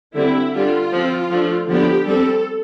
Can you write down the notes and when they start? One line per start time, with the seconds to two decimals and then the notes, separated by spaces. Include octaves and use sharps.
0.15 D3 G3 C4 E4
0.54 D3 G3 D4 F4
0.92 F3 C4
1.30 F3 A3 D4
1.68 D3 F3 B3 D4 G4
2.07 G3 C4 A4